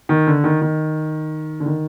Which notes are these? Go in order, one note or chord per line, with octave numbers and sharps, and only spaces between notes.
D#3
D3
D#3
D#3
D3
D#3